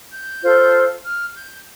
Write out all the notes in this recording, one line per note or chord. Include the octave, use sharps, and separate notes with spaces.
G6
F4 A4 C5
F6
G6